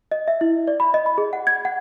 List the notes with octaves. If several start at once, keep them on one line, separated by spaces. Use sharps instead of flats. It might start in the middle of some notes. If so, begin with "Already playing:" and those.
D#5
E5
E4
D5
B5
D#5
B5
G#4
F#5
G#6
F#5